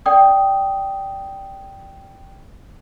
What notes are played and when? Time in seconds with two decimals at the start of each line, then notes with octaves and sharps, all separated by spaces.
0.06 D5 G5 D#6